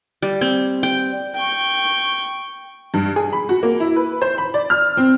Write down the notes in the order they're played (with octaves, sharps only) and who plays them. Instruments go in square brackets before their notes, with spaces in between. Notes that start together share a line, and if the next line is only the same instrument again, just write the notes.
[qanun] G3
C4
G5
[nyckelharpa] G5 C#6
[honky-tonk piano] G2
G#4
B5
F#4
A#3
E4
B4
C5
B5
D5
F6
C4